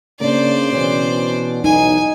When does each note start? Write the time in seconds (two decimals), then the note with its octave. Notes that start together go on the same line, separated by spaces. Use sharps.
0.20 C#3 A#3 D4 C5 D5
0.73 B2 E3 C4 C#4
1.64 B1 D#4 G#5